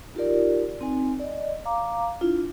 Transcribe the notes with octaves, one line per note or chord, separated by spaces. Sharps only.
D#4 F4 G4 A#4 D5
C4 D#4 G#5
D5 D#5
F5 A#5 D6
D4 E4 F4